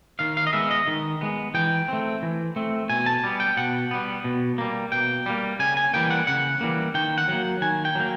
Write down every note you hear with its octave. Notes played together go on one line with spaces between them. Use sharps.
D#3 F5
F5
D#5
G#3 B3 E5
D#5
D#3
G#3 B3
E3 G5
A3 C4
E3
A3 C4
B2 G#5
A5
G3 B3
G5
B2 F#5
G3 B3
B2
G3 A#3
B2 G5
G3 A#3
C#3 G#5
G#5
E3 G3 A#3 G5
F#5
C#3 F#5
E3 G3 A#3
D#3 G5
F#5
F#3 A#3
D#3 G#5
G5
F#3 A#3